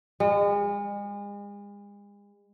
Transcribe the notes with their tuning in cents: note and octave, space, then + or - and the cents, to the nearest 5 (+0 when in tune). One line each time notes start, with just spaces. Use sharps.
G#3 -40